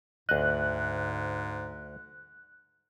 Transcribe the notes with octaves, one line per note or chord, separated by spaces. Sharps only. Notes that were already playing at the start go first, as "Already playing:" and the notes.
D2 G#2 D#5 F#6